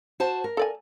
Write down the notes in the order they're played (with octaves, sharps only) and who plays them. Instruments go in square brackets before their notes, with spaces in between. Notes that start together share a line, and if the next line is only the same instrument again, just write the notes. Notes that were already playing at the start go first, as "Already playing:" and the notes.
[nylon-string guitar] F#4 C5 A5
A#4
[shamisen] A4 D5 G#5